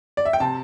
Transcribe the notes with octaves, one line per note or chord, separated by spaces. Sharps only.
D5
E5
G5
C3 A5